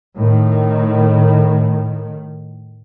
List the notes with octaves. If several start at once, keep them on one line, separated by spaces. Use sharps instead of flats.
A2 D#3